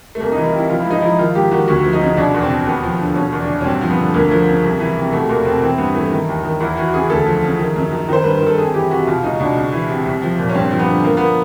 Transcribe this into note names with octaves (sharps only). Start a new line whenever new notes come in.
A3
C2 A#3
D#4
E3
F4
C3 E4
F3 F4
E4
G#2
D#4
F3 E4
D#3 F4
G#2 G4
D#3 F#4
D2 F#4
F3
D#4
C#3
B2 D4
E2
C4
B2
D#2 B3
F3
D3
B2 C#4
E2
D4
B2
C#4
G2 C4
F3
B3
D3
D2 A#3
F3
C#3
C2
E3
C3
B2 A3
E2 A#3
B2 C4
E3 C4
G2 B3
E3 A3
D#3
D#2
D#3
E2 E4
E3 F#4
C#3 G#4
D2 A4
F3
C#3
D#3
F#2
D#3
D#3 C5
G2 B4
A#4
D#3 A4
F2 G#4
E3 G4
C3 F#4
B2 F4
C#2 D#4
B2 D4
C#2
E3
C3
C2
F3
A#2
C#4
G2 C4
F3
B3
D3
F3 A#3
B3